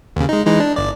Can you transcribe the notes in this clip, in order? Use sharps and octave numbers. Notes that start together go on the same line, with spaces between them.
D#2 C#3
G#3 D#4
E3 G#3 D#4
D4
G1 D5